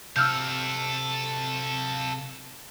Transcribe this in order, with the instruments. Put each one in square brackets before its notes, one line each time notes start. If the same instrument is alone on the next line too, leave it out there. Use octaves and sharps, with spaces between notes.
[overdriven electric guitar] C3 [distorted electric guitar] A4 F5 [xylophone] E6 F6 G6